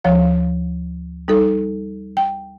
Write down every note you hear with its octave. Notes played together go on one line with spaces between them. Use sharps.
D2 F3 C#5 F5
G3 D#4 A4
G5